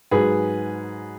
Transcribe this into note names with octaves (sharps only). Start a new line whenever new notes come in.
G#2 F#3 G#4 B4